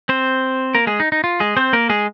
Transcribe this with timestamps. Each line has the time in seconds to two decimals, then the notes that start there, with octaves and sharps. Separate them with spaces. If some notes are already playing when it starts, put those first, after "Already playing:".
0.09 C4 C5
0.75 A#3 A#4
0.87 G#3 G#4
1.00 D#4
1.12 D#4
1.24 F4
1.40 G#3 G#4
1.57 C4 C5
1.73 A#3 A#4
1.89 G#3 G#4